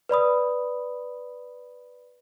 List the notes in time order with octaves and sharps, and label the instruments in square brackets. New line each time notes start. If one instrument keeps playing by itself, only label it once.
[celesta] B4 D5 B5 D#6